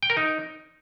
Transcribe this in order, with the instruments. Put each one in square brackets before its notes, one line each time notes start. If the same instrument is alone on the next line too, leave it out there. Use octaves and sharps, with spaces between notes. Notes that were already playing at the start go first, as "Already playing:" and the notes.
[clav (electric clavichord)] G5
A#4
D#4